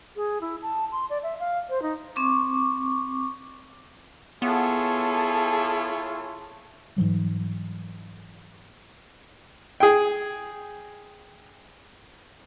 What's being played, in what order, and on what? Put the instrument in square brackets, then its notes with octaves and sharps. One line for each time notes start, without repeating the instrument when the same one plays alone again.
[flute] G#4
E4
A5
C6
D5
E5
F5
C5
D#4
[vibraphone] C4 C#6 D6
[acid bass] B3 [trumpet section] E4 F4 C#5 [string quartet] G#4 A4
[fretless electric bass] G#2 E3 F#3 G3
[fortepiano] G#4 G5